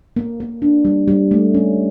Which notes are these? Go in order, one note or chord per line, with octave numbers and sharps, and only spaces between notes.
A#3
A#3
D4
G3
G3
A3
C#4